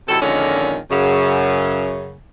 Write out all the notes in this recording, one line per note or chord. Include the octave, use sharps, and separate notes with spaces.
C3 D#3 F#3 E4 A4
F2 A#2 D3 D#3 G#3 C#4
F#2 C#3